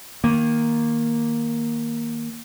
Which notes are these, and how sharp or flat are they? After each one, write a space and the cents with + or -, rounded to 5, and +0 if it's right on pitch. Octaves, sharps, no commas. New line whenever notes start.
D#3 +0 A#3 +0